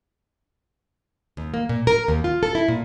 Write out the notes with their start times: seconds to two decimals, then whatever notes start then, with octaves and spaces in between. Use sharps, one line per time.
1.37 D#2
1.54 A#3
1.69 A#2
1.87 A#4
2.08 D#2
2.24 F4
2.43 A4
2.55 E4
2.68 A#2